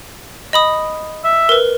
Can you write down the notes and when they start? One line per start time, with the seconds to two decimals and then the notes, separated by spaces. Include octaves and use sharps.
0.53 D#5 B5 D#6
1.24 E5
1.49 A#4 B4